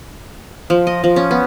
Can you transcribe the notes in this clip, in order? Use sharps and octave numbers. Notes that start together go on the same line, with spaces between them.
F3
D#5
F3
C#4
B3